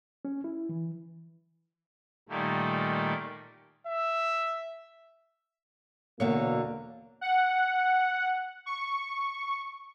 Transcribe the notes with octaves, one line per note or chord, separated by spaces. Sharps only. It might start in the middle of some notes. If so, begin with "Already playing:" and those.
C#4
E4
E3
A#2 D#3 G3 A3 A#3
E5
E2 B2 D3 A#3 C#5
F#5
C#6